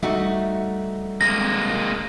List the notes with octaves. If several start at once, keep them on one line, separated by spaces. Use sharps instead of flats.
G3 A3 D#4 F#4
G#3 A#3 A#6